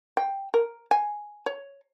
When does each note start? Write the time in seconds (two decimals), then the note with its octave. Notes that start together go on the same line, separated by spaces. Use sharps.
0.17 G5
0.54 A#4
0.91 G#5
1.46 C#5